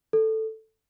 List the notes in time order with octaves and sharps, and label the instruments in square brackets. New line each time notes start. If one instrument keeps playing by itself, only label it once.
[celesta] A4